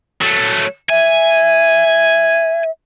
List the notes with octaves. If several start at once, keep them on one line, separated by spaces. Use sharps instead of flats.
F#3 A3
E5 G#5